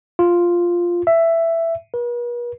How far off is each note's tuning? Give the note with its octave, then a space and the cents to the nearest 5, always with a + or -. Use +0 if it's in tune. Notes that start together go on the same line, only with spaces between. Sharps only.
F4 +0
E5 +10
B4 -45